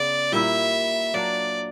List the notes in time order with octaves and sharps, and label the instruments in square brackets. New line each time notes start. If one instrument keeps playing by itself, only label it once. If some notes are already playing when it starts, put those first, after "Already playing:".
Already playing: [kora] C#3 B3 [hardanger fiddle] D5
[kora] A#2 G3 A#3 E4 [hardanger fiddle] E5
[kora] F#3 A#3 D4 [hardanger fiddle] D5